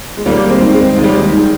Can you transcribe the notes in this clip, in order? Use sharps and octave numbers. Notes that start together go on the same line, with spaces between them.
G#3
D#2 G3 A#3
G#3 C4
D#3
G#3 C4
D#2
G3
G#3
D#3